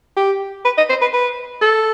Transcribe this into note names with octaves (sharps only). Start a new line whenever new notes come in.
G4
B4
D#5
C5
B4
B4
A4